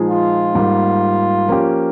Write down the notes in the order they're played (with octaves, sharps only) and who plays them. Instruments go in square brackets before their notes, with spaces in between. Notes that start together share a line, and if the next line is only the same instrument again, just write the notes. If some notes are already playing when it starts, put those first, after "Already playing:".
Already playing: [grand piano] A#2 F3 G#3 D#4 G#4
[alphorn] F4
[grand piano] G#2 G3 A#3
F3 A#3 C#4 G4